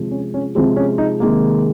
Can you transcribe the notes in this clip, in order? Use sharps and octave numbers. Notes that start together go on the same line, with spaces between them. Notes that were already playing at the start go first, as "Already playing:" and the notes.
Already playing: C3 F3 G#3
C#4
C#4
C3 F3 G#3 C4
C#4
D#4
C3 D#3 G#3 A#3